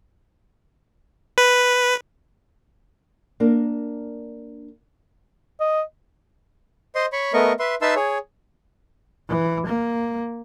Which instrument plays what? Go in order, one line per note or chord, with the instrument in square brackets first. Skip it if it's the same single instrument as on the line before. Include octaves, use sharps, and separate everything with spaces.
[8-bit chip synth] B4
[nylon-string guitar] A#3 D4 A#4
[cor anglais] D#5
[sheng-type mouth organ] C5 D#5 C6
C#5 B5 C#6
A3 B3 A#4 D#5 C#6
B4 E5 C6
D#4 B4 E5 A5 C6 E6
G#4 C#5
[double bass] E3
A#3